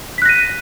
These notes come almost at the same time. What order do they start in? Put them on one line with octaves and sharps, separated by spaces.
B6 F#6 A#6 D#7